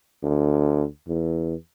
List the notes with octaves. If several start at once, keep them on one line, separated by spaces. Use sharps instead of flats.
D2
E2